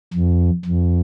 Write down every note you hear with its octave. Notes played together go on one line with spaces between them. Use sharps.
F2
F2